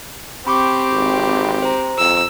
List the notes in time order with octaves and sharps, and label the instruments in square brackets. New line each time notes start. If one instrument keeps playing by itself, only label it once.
[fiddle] C4 G4 [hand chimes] B5 C#6 D6
[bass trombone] G#1
[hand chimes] C5 A#5
[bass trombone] F2 [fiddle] E6